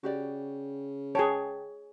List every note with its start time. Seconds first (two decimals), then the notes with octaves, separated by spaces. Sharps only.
0.03 C#3 F#4 G4 D5
1.15 G#4 B4 C#5 G5 A5